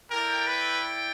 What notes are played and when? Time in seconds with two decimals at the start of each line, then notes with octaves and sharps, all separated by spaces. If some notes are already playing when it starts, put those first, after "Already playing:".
0.10 E4 A4 A#4 D5 G5
0.47 B4